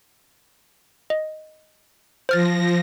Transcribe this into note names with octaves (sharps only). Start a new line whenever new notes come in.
D#5
F3 C5 F6 A6 A#6